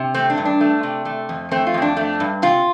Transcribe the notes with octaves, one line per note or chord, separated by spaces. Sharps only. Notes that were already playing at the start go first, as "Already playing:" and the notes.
Already playing: C3
A3 C4
D4
G2
D4
A3
C3
A3
F2
A3 C4
F4
F2 C4
D4
A3
G2
C3 F4